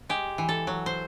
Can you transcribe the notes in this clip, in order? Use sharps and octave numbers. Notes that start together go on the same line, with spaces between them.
G#3 G4
E3
A4
F#3
C5